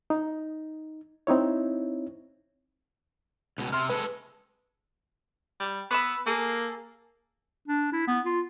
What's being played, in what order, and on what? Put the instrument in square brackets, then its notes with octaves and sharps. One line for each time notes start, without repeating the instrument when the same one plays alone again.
[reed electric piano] D#4
C4 D#4 E4 C#5
[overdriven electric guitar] C#2 B2
[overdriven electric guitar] C3 [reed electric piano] C6 F6
[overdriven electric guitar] G#3 A4 [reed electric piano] B4
[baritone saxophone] G3
[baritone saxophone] B3 [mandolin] B5 D#6 E6
[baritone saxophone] A#3 [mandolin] G#4 A4
[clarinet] D4
E4
B3
F4